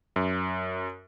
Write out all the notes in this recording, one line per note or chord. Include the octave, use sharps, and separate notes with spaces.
F#2